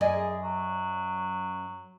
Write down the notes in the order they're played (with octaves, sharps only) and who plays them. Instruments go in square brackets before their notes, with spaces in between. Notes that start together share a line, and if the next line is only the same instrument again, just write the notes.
[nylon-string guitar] F#2 D5 D#5 [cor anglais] G#5
[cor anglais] G#4
F#3